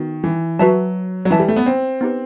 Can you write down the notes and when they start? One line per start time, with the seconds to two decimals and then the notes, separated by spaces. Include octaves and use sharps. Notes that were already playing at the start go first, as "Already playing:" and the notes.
Already playing: D#3 B3 D#4 F#4
0.24 E3
0.59 F#3 F#4 B4 E5 A5
1.25 F#3
1.30 E3 E4 B4 E5 A5
1.39 G3
1.48 A3
1.56 B3
1.66 C4
2.01 B3 D#4 G4 B4